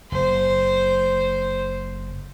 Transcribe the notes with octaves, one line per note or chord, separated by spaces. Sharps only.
F#1 C5